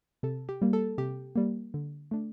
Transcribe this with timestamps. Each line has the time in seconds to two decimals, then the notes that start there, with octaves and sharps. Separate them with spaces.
0.23 C3 A4
0.49 G4
0.62 G3 A#3
0.73 A4
0.98 C3 G4
1.36 G3 A#3
1.74 D3
2.11 A3 D4